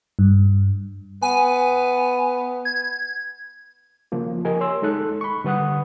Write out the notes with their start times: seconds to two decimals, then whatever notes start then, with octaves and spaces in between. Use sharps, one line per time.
0.19 G2
1.22 B3 G#5
2.65 G#6
4.12 C#3 F3 A#3
4.45 G4 A#4 D#5 G#5
4.61 C#5 C6 E6
4.82 G#3 D#4 A4 F#6
5.21 B5 C#6
5.44 D3 G3 B4 F#5 D#6 F#6